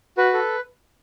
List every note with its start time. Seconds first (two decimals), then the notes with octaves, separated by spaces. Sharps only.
0.17 F#4 B4
0.34 A4